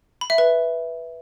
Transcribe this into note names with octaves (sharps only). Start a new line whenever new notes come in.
B5
E5
B4